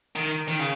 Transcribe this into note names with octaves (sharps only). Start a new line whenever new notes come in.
D#3
D#3
C#3